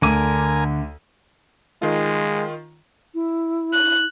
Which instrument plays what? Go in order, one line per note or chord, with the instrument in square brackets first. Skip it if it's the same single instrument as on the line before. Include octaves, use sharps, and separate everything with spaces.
[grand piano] D2 D#7 [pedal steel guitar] D3 D6 [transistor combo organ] A#4 G#5
[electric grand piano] D#3 F4 [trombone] G#3
[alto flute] E4
[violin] F#6